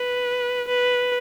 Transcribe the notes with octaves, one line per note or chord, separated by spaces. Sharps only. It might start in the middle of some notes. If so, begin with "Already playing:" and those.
Already playing: B4
B4